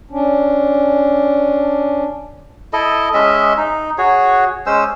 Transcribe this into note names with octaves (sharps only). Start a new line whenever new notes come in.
C#4 D4
E4 A4 D#5
G#3 C#4 D#5 E5
D#4
F#4 G#4 C#5
G#3 C#4 C5 E6